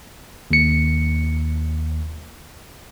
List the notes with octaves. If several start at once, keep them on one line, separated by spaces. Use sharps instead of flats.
D#2 C#7